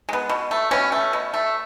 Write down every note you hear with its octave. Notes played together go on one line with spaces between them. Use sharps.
G#3 B3
B2
A3
B2 C#4
A3
B2
A3